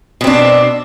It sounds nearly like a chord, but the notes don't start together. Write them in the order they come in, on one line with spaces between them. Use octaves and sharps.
B2 C4 D4